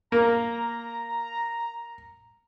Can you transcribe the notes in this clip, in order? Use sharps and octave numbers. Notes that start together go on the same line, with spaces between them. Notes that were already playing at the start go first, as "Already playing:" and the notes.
A#3 A#5